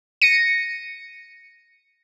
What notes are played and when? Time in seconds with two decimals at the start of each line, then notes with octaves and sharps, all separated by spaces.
0.22 A#6 C#7 D#7